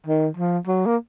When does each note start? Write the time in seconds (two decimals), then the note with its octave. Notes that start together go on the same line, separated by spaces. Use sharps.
0.06 D#3
0.37 F3
0.67 F#3
0.86 A#3